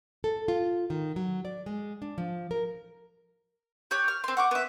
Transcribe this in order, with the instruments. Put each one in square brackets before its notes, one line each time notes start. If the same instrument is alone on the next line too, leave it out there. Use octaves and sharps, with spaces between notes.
[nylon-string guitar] A4
F4
D#3
F#3
D5
G#3
D4
F3
A#4
[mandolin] G4 C#5 F#6
F6
C4 C6
F#5 C#6 D6
B3 E5